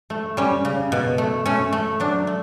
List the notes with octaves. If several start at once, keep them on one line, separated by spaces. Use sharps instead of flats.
A3
G3 C#4
C#3
B2
A3
A3 C#4
A3
F#3 D4
A3